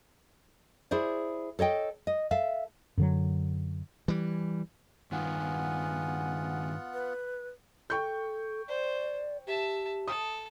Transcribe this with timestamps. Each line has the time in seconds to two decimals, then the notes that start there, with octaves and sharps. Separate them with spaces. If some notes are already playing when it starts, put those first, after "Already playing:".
0.91 E4 G#4 C5 D5
1.59 A4 C#5 D#5 G5
2.07 D#5
2.31 A4 E5 F5
2.97 F#2 D3 F#3
4.08 E3 G3
5.12 G2 D#3 B3 F4 F#5 G#5
6.93 B4
7.90 A4 G5 C#6 G6
8.68 C5 D5
9.47 G4 E5 A5
10.08 A4 D#6